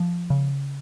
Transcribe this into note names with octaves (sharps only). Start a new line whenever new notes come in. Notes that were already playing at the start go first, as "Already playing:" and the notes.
Already playing: F3
C#3